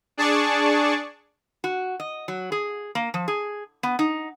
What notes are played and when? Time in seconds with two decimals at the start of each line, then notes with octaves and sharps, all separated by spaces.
0.17 D4 G#4 D5 A5 C#6
1.64 F#4
2.00 D#5
2.28 F#3
2.52 G#4
2.95 A#3
3.14 F3
3.28 G#4
3.83 B3
3.99 D#4